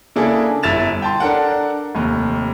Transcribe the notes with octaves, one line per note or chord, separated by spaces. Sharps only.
C#3 A#3 D4 E4 G#4 A4
G1 E4 A6 E7 F7
G5 A5 C6
D4 A4 A#4 F#5
F1 D#2